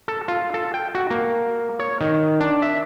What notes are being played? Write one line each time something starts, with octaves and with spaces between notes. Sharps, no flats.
A4
F4
A4
G5
F#4
A#3
C#5
D#3
D4
E5